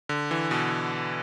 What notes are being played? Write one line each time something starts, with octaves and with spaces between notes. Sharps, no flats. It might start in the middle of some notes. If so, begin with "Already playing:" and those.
D3
E3
B2